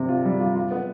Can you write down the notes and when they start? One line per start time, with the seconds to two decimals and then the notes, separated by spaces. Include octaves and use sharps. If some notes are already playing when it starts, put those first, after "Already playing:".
Already playing: C3 C4
0.09 F4
0.25 G3
0.40 F4
0.55 F4
0.71 B3